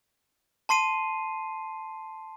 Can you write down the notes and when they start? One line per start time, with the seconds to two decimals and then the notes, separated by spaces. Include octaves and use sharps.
0.69 A5 C6 C7 D#7